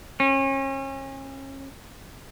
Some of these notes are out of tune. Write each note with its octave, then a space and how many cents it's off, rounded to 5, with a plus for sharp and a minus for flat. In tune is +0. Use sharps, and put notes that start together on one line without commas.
C#4 -35